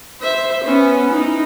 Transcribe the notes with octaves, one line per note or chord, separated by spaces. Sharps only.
C5 E5
B3 C#4
D#4 E4